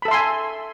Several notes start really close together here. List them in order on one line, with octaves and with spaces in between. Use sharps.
B5 A4 E5 C6 G#5